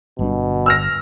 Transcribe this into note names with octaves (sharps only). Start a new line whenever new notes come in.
G1 B2 G3 D4
E6 F6 A#6